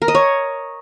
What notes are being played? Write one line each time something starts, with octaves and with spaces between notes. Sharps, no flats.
A#4
D#5
C#5